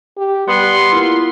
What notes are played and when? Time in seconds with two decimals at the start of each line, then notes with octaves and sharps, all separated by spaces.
0.17 G4
0.48 G3 B3 G4 C6
0.92 A#3 E4 F4